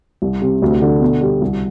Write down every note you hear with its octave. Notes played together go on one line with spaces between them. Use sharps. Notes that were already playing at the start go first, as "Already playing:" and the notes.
C2
C3
D2
D3
B2
G3
C2